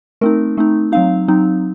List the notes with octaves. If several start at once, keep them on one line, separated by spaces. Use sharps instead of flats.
A3 C4 D#4 A#4
A3 C4 D#4
F#3 C4 D#4 F5
F#3 C4 D#4